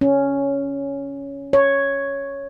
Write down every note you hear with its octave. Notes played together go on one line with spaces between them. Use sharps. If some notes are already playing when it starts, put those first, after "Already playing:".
C#4
C#5